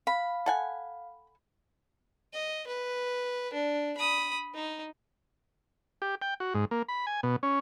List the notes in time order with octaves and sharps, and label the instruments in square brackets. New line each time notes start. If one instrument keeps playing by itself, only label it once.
[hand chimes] F5 [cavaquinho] B5
[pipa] A4 F#5 G#5
[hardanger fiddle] D#5
B4
D4
B5 D#6
D#4
[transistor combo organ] G4
G5
F#4
G#2
A#3
B5
G#5
B2
C#4